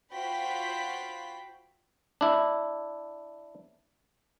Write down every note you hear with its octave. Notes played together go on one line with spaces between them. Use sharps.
F4 F#4 C5 G5 B5 B6
D4 E4